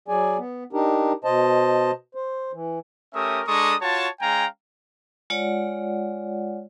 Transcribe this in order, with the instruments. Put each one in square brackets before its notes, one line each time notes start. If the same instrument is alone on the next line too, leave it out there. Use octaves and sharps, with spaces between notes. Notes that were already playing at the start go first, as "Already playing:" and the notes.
[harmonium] F#3 G#4 D5 G#5
B3
D4 D#4 G4 A#4
B2 C5 D#5 A5
C5
E3
[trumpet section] A3 C#4 G4 A#4 E5 D#6
G#3 D4 A4 A#5 C#6 D#6
F4 F#4 C#5 A5
G#3 C#4 F5 G5 G#5 A#5
[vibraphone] G#3 F4 C#5 D5 F#5